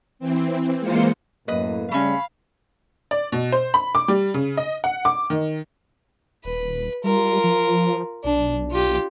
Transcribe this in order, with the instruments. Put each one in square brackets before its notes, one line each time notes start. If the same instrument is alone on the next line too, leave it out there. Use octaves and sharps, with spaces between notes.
[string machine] E3 C4
E3 G#3 A#3 F4 C5 C#7
[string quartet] F#2 [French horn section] A2 A#3 [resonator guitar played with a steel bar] B4 D#5
[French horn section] C#3 G3 [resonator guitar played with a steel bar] A3 C#4 [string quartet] F5 [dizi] B5
[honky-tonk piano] D5
B2
C5
B5
D6
G3
C#3
D#5
F#5
D6
D#3
[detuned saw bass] D#1 [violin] B4
[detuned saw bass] G3 [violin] F4 A#4
[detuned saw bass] F3
[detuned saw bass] B1 [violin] D4
[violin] F4 G4